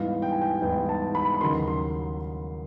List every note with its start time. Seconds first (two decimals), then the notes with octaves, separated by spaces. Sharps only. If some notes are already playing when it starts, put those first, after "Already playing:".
Already playing: G#2 E3 G3 B3 E4 F5
0.22 G5
0.32 G#5
0.42 G5
0.61 G#2 E3 G3 B3 E4 G5
0.89 A5
1.15 B5
1.34 B5
1.41 D#2 C#3 F#3 A#3 D#4 C6
1.68 C6